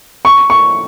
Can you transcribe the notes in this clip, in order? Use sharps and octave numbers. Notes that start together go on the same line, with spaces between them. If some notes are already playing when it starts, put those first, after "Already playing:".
C#6
C#6